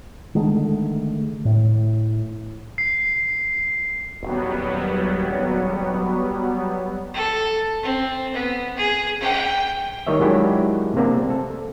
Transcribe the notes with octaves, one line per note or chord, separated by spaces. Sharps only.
D3 D#3 G#3 A3
A2
C7
D#1 F#3 G3 B3
A4
C4
B3
G#4
G5
D#3 G3 C#5 D#5 E5
D#3 F#3 G#3 D4 E4 G4
C3 A#3 C4 D4
A4